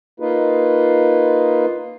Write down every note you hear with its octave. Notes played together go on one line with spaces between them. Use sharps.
A#3 D#4 F4 B4